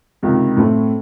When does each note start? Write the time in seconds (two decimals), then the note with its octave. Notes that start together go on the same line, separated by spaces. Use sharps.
0.23 C#2 C3 D#3
0.57 A2 A3 C4